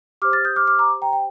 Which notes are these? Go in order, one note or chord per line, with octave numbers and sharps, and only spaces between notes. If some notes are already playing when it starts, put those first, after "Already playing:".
G4 C5 D6 F6
F6 A6
D#6 G6
D6 F6
D6 F6
A#5 D6
G5 A#5
G5